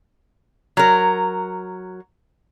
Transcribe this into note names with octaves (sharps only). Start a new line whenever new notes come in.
F#3 A#4